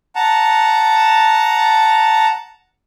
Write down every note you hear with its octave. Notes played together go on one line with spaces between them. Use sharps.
F#5 A5 A#5